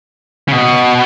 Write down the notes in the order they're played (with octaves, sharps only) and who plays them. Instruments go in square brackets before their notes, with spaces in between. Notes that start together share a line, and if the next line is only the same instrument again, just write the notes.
[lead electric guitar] C#3
B2